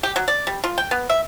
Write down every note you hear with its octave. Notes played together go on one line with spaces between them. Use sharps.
G4
F#3
D5
G3
F4
G5
B3
E5